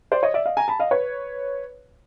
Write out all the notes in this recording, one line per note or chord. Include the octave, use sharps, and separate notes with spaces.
C5 D5
C#5 D#5
D5 E5
D#5 F5
G#5 A#5
A5 B5
D#5 F5
B4 C#5